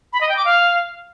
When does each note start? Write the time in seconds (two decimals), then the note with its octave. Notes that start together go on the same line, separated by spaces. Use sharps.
0.13 B5
0.21 D#5
0.29 G5
0.37 D6
0.45 F5